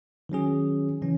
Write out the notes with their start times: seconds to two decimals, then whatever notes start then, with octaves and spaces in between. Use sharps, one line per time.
0.29 D#3 F#3 C#4 G#4
1.02 C#3 E3 C#4